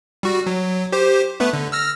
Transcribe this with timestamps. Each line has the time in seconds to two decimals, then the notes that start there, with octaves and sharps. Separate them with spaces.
0.23 G3 F#4
0.47 F#3
0.92 G4 C5
1.40 A3 B3 B4
1.53 D3
1.72 E6 F6 A#6